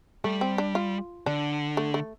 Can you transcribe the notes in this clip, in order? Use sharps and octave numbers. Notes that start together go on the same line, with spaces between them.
G3 A3
C4
D4
F4
D3 D4
A3
A3